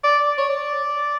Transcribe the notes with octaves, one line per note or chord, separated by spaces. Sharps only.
D5
C#5
D5